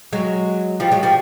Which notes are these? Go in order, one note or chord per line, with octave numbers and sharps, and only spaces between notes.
F#3 G#3
F3 G3
F#3 G#3
F3 G3